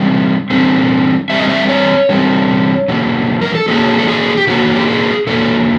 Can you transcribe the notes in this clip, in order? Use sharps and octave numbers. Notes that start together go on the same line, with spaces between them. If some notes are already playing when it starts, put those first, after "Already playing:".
Already playing: D3 G3 C4
D3 G3 C4
D3 G3 C4 E5
D#5
E5
C#5
D3 G3 C4
D3 F#3 A#3
A#4
A4
D3 F#3 A#3 G#4
A4
G#4
G4
D3 F#3 A#3 F#4
G4
G#4
D3 F#3 A#3 A4